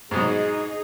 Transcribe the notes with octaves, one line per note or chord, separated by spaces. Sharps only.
G#2 B2 F#3 D#4 G#4